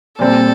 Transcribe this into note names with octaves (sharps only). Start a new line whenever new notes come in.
A#2 G3 C4 A4